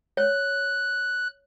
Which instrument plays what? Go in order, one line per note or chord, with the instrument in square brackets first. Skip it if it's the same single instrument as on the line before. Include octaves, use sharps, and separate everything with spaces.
[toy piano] C#5 [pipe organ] F#6